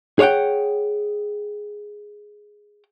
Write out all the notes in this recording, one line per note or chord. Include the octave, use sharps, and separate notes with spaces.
G#4 C#5 D5 F#5 G5